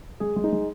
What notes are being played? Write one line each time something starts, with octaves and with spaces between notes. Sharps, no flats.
G#3 G#4
G#3
D#4
G#3